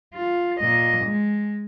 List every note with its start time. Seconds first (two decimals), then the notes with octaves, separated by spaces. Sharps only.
0.15 F4
0.60 A#2 D#5
1.05 G#3